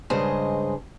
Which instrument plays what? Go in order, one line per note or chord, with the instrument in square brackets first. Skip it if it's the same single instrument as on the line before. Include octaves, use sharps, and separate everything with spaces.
[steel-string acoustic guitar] G2 C#3 G#3 G#4 C5 D#5